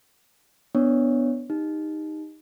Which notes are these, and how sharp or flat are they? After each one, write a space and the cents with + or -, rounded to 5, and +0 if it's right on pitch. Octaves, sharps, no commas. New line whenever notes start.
B3 +0 D4 +0 C#5 -5
D#4 +0 G4 +25